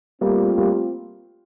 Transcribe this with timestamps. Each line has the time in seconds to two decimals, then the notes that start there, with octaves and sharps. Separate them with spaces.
0.21 G3 A3 A#3 C4 F4
0.58 G3 A#3